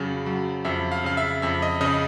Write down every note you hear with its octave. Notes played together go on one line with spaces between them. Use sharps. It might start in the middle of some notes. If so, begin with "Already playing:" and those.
Already playing: F2 C#3 F#3
F#3
F2 E5
F5
C#3 F5
E5
F2 E5
D#5
C#3 D#5